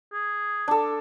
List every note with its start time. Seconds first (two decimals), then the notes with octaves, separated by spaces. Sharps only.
0.13 G#4
0.68 D4 A4